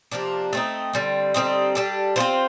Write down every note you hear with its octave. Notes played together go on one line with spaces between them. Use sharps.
C3 F3 A#3 D4
A3 C4 D#4
D3 G3 C4
D3 G3 C4 D#4
G3 D4 A4
C4 F4 C5